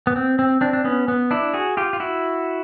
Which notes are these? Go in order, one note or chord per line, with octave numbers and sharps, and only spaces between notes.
B3
C4
C4
C4 D4
D4
B3 C#4
B3
D4 E4
F#4 G#4
F4 G4
F4
E4 F#4